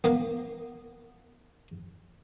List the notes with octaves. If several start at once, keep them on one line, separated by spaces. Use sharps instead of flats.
A#3 B3